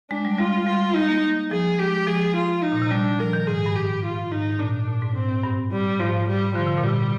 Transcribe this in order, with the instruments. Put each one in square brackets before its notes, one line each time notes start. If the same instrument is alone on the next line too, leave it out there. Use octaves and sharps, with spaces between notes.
[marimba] G#3 [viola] D4
[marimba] G3
[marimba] G3 [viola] F4
[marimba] G3 [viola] F4
[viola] D#4
[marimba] A#3
[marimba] F3 [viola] G#4
[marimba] G#3 [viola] G4
[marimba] F3 [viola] G#4
[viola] F4
D#4
[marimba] A#2
C3
[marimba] G3 [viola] D4
[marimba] F3 [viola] A#4
[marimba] D#3
[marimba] G#2 [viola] G#4
[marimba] G2
[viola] G4
F4
[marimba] G#2 [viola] D#4
[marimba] A#2 [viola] D4
[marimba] A#2
G#2
[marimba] G#2 [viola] C4
[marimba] G2
[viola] G3
[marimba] G#2 [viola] F3
[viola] G3
[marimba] D3 [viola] F3
[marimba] C3
A#2
[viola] G3
[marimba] C3